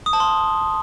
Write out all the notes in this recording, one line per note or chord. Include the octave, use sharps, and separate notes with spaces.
D#6
A5
C6